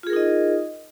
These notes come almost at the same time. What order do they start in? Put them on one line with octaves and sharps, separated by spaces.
F4 G#4 A#4 D#4 D#5